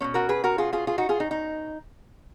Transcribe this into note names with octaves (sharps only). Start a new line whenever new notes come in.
B2 A#3 C#4
F#4 A#4
G#4 B4
F#4 A#4
F4 G#4
F4 G#4
F4 G#4
D#4 F#4
F4 G#4
D#4
D#4